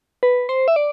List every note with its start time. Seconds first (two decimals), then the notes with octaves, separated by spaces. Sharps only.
0.23 B4
0.49 C5
0.68 E5
0.76 D5